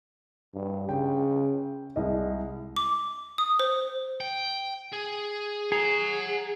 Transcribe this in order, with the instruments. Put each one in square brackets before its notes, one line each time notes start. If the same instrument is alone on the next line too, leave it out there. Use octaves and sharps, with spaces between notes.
[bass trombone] G2
[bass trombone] C#3 [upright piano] G5
[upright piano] C2 D#5 [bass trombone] G#3
[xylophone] D6
D#6
C5
[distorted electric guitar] G5
G#4
[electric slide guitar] G#4 [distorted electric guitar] F#5 A#5